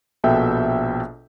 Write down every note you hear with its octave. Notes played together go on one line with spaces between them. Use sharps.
A#1 B2 A4 E5 G5